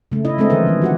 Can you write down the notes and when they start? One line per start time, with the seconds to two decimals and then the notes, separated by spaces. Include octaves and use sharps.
0.12 C#3 A3
0.25 C#3 C#4 E4 D#5
0.38 G#3 A3 C4 D4 A4 D#5
0.50 D3 E3 F3 G#4 A#4 B4
0.67 D#3 F3
0.82 F#4 G4 F#5